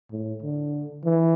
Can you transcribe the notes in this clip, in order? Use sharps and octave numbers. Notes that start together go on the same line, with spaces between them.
A2
D3
E3